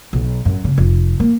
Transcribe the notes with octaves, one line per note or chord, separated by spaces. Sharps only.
B1
F#2
C#3
F1
A#3